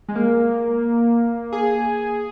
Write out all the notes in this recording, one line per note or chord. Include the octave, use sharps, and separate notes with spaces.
G#3
A#3
G#4